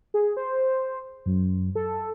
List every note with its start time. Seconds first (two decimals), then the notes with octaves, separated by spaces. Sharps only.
0.14 G#4
0.37 C5
1.26 F#2
1.76 A4